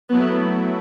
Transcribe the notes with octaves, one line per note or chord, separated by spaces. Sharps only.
F#3 A3 B3 E4